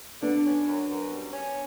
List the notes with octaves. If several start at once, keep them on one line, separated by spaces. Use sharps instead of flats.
D3 B3 D4
C#4
F#2
F#2
G3
C#4